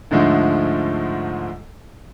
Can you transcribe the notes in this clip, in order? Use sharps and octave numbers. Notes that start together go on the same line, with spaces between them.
D2 G#2 D3 F3 G#3 A3